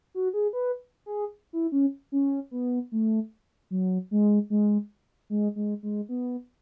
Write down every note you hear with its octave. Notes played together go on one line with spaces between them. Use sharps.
F#4
G#4
B4
G#4
E4
C#4
C#4
B3
A3
F#3
G#3
G#3
G#3
G#3
G#3
B3